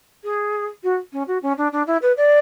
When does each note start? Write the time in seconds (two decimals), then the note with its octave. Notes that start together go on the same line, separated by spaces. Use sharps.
0.23 G#4
0.83 F#4
1.12 C#4
1.27 F#4
1.42 C#4
1.57 D4
1.72 D4
1.87 E4
2.02 B4
2.17 D5